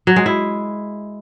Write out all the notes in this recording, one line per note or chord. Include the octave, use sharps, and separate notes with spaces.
F#3
G#3
E4